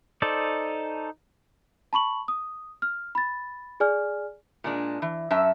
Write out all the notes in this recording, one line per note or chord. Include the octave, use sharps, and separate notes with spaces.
D#4 A4 C5 D5
A5 B5 C#6 F#7
D#6
F6
B5 A6
G#4 D5 G#5 F6
A#2 G#3 D4
E3
F#2 E5 A5